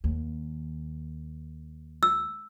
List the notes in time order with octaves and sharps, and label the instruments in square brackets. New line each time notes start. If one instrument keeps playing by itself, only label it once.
[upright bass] D#2
[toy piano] E6